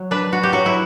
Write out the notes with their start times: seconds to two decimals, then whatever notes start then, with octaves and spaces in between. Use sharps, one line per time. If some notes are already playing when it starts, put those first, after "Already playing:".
Already playing: F#3
0.11 D4 B4
0.33 F#4
0.43 G4
0.52 F#3 F#4
0.66 E4